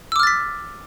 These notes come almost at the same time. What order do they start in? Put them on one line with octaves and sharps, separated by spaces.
E6 D6 F6 A6 B6